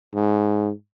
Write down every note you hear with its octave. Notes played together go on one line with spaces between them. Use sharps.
G#2